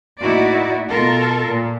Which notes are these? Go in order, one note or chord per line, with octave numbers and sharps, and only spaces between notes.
A2 A#3 D#4 E4 F#4 D5
B2 F4 A4 A#4
A#2